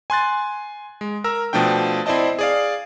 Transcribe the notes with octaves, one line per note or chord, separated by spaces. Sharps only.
G#5 C6 F#6 A6
G#3
A#4 A#5 E6
B2 F3 A3 D4 G5
C4 E4 C5 D5 D#5 A5
G#4 D5 F5